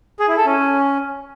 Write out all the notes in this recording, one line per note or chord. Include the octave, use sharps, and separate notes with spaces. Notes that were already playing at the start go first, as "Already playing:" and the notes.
G#4
E4
A4
C#4